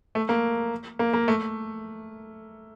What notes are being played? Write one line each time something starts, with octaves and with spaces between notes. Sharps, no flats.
A3
A#3
A#3
A#3
A3